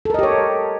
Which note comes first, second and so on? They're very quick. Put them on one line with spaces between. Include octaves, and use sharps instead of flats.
A4 A#4 D#5 G4 C#5